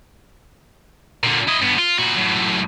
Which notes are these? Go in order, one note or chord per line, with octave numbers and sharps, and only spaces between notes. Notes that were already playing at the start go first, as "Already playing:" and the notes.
A#2 D3
E4 D#5
G2 B3
F4
A#2 F#4
F#2 A2